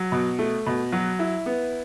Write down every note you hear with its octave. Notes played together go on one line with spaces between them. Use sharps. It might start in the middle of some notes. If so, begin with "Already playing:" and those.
Already playing: F#3
B2
A3
B2
F#3
E4
B3